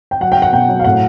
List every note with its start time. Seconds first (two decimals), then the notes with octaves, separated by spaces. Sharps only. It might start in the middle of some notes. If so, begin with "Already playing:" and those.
0.11 G5
0.20 F#3 F#5
0.32 G5
0.37 F#3
0.42 F#5
0.53 B2 G5
0.69 F#3
0.79 F5
0.84 A2 F#5